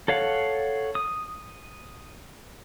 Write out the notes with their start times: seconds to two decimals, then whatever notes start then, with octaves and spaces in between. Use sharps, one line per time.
0.08 A4 C#5 F5 F#5
0.95 D#6